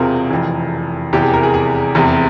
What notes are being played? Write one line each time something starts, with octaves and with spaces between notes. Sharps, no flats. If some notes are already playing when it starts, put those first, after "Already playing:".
Already playing: E1 E2 C3 C4 F4 G#4 A#4
F1 F2 E3
F1 E2 C3 E3 G4
G#4
A#4
G#4
G#4
F1 E2 C3